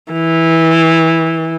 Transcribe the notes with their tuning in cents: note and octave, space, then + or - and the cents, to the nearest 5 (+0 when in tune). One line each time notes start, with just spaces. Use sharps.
E3 -15